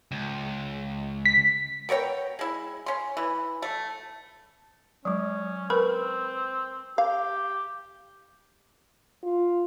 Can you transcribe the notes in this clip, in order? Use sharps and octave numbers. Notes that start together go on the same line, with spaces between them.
C#2
B6
B3 A#4 C#5 G5
G#3 E4
C#4 C6
E3
A3
F#3 G#3 C#4
C4 A#4 B4 B5
G4 F5
F4